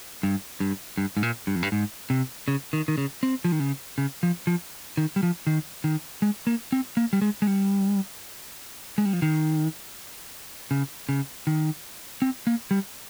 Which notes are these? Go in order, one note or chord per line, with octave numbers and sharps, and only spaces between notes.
G2
G2
G2
G#2
A#2
G2
F2
G2
G#2
C3
C#3
D#3
D#3
C#3
C4
F3
D#3
C#3
C#3
F3
F3
D#3
G3
F3
D#3
D#3
G#3
A#3
C4
A#3
G3
G#3
G#3
G3
G#3
G3
F3
D#3
C#3
C#3
D#3
C4
A#3
G3